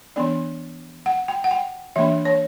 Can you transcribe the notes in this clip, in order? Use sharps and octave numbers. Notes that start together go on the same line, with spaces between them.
E3 B3 D4 D5
F#5
G5
F#5
G5
E3 A#3 D4 E5
C#5